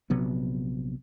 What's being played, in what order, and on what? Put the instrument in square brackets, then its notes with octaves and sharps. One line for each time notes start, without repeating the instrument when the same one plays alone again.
[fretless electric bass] A#1 C3 F#3 B3